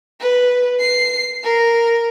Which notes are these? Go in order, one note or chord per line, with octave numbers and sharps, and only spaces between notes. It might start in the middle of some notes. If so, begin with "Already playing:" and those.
B4
C7
A#4